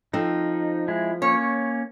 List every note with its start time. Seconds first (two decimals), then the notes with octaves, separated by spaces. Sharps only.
0.13 F3 C4 D#4 A4
0.88 G#3 E4
1.22 A#3 C#4 C#5